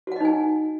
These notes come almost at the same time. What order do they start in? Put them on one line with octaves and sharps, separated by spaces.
F#4 F#5 D#5 D#4 G#5